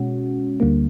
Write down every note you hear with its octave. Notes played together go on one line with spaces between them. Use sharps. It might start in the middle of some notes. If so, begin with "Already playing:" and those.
Already playing: B2 G#3 C#4 F#4
D2 D3 G3 A#3